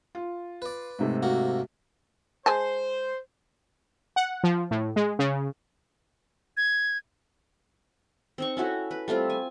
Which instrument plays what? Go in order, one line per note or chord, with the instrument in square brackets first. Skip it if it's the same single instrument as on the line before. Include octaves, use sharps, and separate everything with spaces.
[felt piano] F4
[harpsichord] B4 D5
[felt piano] G#2 C3 A3
[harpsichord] A#3 F#4
[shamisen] G#3 G#5 A5 [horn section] C5
[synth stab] F#5
F3
A2
G#3
C#3
[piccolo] G#6
[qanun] C4 D#4 C#6
C#4 E4 F#4 A4
B4
G3 A3 C4 F4
G#5